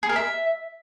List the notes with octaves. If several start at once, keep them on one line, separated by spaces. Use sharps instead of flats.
G#4
A#4
E5